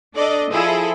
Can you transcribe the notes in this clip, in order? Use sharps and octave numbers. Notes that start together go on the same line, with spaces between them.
D4 A4 D5 D#5
F3 E4 G#4 A4